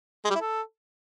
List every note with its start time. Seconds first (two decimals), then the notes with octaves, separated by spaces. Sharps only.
0.25 G#3
0.30 G3
0.35 E4
0.41 A4